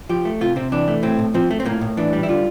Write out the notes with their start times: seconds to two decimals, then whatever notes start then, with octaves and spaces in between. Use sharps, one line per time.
0.09 F3 G4
0.25 A3
0.41 C3 F4
0.56 C3 C4
0.72 E3 D4
0.88 A3
1.03 A2 C4
1.19 A2
1.34 F3 C4
1.51 A3
1.60 C4
1.66 A2 A#3
1.81 A2
1.97 E3 D4
2.13 G3
2.23 E4
2.29 D3 F4